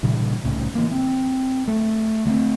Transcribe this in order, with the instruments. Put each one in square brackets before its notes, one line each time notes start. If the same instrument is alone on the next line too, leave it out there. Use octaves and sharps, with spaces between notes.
[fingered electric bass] G2 A#2 C#3 E3
C2 A2 C#3
E3 A#3
C4
A3
D3 A3 B3 C4